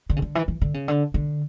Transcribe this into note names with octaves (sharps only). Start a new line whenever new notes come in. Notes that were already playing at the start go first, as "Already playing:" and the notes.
D3
C#3
D3
E3
E3
D3
C#3
D3
D3